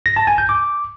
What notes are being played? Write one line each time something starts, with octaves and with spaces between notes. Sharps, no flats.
A#6
A5
G#5
G6
D6